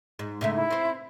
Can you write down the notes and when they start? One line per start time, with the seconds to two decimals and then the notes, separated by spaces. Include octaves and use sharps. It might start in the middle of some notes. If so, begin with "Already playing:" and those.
0.19 G#2
0.41 G#2 C#3 A3 E5
0.55 E4
0.71 C4 C5